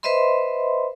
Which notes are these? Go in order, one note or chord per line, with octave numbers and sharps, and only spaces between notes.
B4 C5 D#5 E5 B5 C6